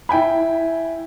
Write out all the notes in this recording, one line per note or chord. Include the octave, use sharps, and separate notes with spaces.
E4 G5 G#5 B5